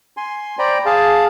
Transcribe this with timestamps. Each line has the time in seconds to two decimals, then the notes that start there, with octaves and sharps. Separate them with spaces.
0.17 G#5 C6
0.59 C5 D5 G5 A#5 B5
0.86 G#4 F5 A5